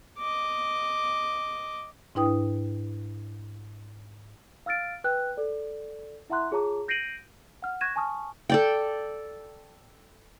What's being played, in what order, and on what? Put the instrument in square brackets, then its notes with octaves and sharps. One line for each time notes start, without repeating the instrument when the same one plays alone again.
[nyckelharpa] D#5 D6
[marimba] G#2 D4 E4 B4 G5 D#6
[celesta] F5 E6 F6 A6 D7
B4 G5 F#6
A4 D5
E4 E5 F#5 A#5 C6 F#6
F4 G#4 C#5 A5 A#5 D6
G6 A#6 C7 D7 D#7 F#7
F#5 F6
C#6 F#6 G#6 A#6 D#7 E7
G#5 A5 C#6 D#6 F6
[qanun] A4 D5 G5